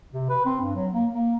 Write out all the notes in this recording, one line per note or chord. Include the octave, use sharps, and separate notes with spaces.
C3
B4
C4
G2
F#3
A#3
A#3